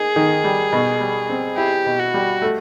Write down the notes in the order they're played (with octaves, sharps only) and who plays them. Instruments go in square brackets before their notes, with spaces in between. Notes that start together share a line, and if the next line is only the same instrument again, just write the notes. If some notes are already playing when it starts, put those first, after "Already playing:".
Already playing: [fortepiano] A#3 D#4 [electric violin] G#4
[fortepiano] D#3
G3
B2
G3
C4
[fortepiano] E4 [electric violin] G4
[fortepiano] B2
[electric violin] F#4
[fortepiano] G3
A3